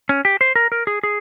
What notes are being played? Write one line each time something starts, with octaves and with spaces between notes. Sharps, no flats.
C#4
G4
C5
A#4
A#4
G#4
G#4